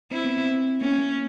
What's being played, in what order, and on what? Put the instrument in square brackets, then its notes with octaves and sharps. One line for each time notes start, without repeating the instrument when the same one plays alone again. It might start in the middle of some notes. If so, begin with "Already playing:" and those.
[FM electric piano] C4 [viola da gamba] E4
[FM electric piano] B3
C4
[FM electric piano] A#3 [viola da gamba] C#4
[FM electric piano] A#3